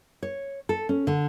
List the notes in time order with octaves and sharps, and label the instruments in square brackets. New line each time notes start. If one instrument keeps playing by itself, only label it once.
[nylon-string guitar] C#5
A4
C#4
D3